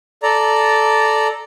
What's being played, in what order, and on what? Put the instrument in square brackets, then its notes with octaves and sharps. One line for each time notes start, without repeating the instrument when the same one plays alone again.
[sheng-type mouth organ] A4 D5 A#5